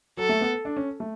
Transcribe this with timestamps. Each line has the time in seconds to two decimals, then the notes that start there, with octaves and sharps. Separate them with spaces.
0.17 F#3 A4
0.29 A3
0.41 B3
0.65 D4
0.77 C#4
1.00 A3